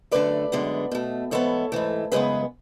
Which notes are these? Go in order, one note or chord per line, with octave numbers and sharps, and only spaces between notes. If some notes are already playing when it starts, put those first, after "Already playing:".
F#2 D3 A3 B4 D5
F#2 D3 G#3 B3
B2 A3
G#2 E3 B3 A4 C#5
G#2 E3 A3
F#2 C#3 G#3 B3 G#4 B4